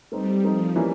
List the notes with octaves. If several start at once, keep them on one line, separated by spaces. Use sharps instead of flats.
G3 A3 C4 D#4
F3 A3 C4 D#4
E3 G3 A#3 C#4 E4